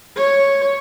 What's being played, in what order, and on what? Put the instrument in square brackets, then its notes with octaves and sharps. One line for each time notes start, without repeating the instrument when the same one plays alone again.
[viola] C#5